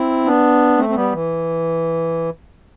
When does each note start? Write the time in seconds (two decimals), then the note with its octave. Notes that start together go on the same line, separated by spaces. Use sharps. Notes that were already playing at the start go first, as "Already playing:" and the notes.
Already playing: C4 E4
0.25 B3 D4
0.77 A3 C4
0.89 C4
0.95 G3 B3
1.13 E3